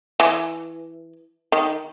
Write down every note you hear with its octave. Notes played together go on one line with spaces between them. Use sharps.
E3
D#3